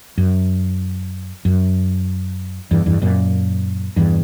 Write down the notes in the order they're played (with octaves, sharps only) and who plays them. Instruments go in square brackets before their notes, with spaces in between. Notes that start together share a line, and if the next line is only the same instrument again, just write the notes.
[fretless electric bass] F#2
F#2
E2 G2
E2 G2
F#2 A#2
E2 G2